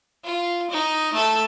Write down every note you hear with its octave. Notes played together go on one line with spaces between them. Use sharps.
F4
D#4
A3 A4